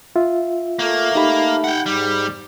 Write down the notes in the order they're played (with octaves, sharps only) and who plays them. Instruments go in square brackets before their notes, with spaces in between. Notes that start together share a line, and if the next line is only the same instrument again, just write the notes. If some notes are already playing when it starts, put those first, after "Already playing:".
[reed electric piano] F4 E5
[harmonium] A3 [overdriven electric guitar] A#3
[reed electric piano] D#4 G4 B5
[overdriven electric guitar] F#5 G5
[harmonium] G#2 [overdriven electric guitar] G3